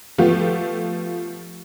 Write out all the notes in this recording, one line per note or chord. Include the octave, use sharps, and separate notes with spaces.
F3 A3 B3 F4 G4